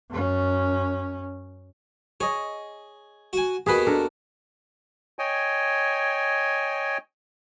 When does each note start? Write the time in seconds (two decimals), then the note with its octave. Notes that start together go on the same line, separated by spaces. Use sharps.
0.10 F#2 C#4
2.20 G#4 C#5 D#5
3.33 F#4 G#5
3.66 D#2 B2 B3 G#4 B4
3.87 D4 A4 A#4
5.19 C#5 D#5 G5 G#5